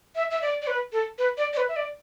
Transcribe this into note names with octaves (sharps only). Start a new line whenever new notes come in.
E5
E5
D5
D5
B4
A4
B4
D5
D5
B4
E5
D5